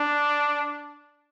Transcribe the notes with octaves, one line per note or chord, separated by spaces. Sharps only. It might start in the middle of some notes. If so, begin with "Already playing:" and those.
Already playing: D4